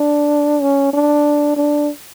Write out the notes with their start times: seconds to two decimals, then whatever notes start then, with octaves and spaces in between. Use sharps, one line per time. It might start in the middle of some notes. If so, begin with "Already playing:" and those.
Already playing: D4
0.62 C#4
0.93 D4
1.57 D4